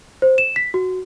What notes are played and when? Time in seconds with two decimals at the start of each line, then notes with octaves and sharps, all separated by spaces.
0.22 C5
0.38 E7
0.56 B6
0.74 F#4